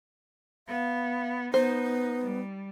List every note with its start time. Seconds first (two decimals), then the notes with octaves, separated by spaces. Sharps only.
0.68 B3 F5
1.54 B3 D#4 C5
2.21 G3